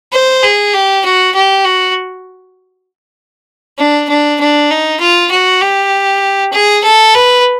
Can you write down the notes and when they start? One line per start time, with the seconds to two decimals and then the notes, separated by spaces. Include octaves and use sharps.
0.13 C5
0.43 G#4
0.74 G4
1.05 F#4
1.35 G4
1.65 F#4
3.78 D4
4.09 D4
4.40 D4
4.71 D#4
5.00 F4
5.31 F#4
5.61 G4
6.52 G#4
6.84 A4
7.15 B4